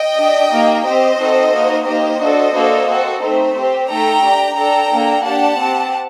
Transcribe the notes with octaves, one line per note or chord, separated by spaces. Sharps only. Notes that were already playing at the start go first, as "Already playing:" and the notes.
Already playing: D#5 G5
D4 G4
A#3 D#4 G4
C4 G4 C5 D#5
C4 D#4 F#4 A4
A#3 D#4 F#4
A#3 D#4 G4 C5 D#5
D4 F#4 A4
A#3 D4 F#4 A4
C4 F#4 A4
A3 C4 D#4 C5
C4 G4
A3 D#4 A4 G5 A#5
D4 G4
D4 A4 G5 A#5
A#3 D4 A4
D4 G4 F#5 A5
C4 G4